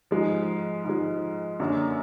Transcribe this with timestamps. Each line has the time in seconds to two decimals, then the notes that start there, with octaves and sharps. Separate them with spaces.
0.11 G#2 F3 G#3
0.85 G#2 F3 G#3
1.60 F#2 D3 F#3 A#3 D4